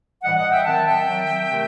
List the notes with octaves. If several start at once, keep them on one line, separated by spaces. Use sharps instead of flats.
A2 E3 G3 D#5 F#5
D#5 F#5
E5 G5
D#3 F#3 C4 F#5 A5
E5 G5
D#3 F#3 C4
C3 D#3 A3 C4